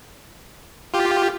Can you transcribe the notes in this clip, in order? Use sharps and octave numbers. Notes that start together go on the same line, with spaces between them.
F4 G4